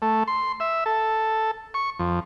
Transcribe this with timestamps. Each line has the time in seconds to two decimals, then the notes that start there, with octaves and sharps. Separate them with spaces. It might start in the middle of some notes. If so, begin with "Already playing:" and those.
0.02 A3
0.27 C6
0.60 E5
0.86 A4
1.74 C#6
1.99 F2